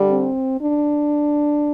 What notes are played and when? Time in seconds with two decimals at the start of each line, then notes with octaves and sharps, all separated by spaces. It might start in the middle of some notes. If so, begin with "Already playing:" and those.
Already playing: D3 G3
0.10 C4
0.61 D4